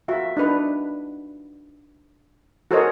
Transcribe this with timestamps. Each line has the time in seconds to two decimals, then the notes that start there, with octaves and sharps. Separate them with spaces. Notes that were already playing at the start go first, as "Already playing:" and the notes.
0.08 F4 F#4 E5
0.37 D4 D#4 B4
2.71 F#4 A4 A#4 C5 C#5 D#5